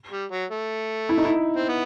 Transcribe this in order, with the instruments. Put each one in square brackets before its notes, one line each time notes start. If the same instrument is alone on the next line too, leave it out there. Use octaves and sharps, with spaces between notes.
[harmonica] G3
F#3
A3
[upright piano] E4
D#4
E4
[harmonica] C4
B3